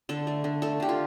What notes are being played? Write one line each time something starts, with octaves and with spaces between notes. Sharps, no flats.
D3 A4
A3
D3
A3 A4
D3 G4
F4